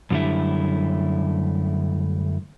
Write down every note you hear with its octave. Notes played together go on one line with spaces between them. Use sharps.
F#2 D3 G3 A3 E4